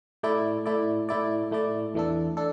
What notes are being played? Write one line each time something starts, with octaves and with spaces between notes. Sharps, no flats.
A2 A3 E4 D5
A2 A3 E4 D5
A2 A3 E4 D5
A2 A3 E4 D5
E2 E3 A3 D4 A4
D4 A4